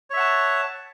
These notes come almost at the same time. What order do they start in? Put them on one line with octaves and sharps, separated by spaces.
C#5 E5 F#5 A5